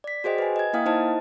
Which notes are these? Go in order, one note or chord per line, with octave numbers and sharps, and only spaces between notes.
D5 B6
F#4 G#4 C5 D#5 G5
B4 G#5
D#5 G#6
A#3 E4 F5 G5 D#6
D#4 E4 C5 D#5 A5